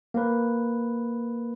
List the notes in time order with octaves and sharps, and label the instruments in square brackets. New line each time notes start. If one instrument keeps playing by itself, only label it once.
[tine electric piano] A#3 B4